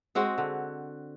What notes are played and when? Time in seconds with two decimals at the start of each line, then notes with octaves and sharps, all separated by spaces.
0.15 G#3 C4 F#4
0.38 D3